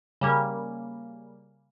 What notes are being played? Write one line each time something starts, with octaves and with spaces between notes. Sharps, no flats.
C#3 G3 A#3